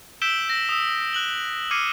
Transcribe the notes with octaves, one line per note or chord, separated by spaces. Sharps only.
E6 G6 B6 D7 E7 G7
E6 A#6
D#6 E6
F#6 F#7 G7
D6 F6 G#6 C7 C#7 D#7